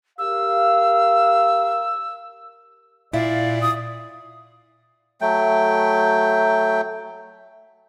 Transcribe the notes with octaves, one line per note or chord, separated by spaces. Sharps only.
G4 A#4 F5 E6
A#2 E4 D5 F5
D#6
F#3 A3 G5